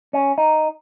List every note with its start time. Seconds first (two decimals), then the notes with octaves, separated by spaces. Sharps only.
0.13 C#4
0.38 D#4